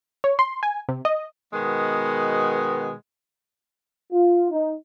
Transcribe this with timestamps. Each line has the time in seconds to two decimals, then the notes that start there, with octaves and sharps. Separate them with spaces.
0.24 C#5
0.39 C6
0.63 G#5
0.89 C3
1.05 D#5
1.53 B2 D#3 G#3 B3
4.12 F4
4.51 D#4